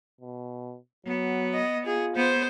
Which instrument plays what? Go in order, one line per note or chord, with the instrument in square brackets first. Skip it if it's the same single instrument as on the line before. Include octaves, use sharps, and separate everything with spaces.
[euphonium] B2
[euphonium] F#3 [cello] B3
[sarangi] D#5
[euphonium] F4 [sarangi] G#4
[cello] B3 [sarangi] C5